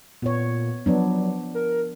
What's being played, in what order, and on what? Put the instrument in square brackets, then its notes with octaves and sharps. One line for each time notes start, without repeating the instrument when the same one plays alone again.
[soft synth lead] A#2 [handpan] B3 C#5
[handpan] F3 B3 D4 [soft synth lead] F#3
[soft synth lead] A#4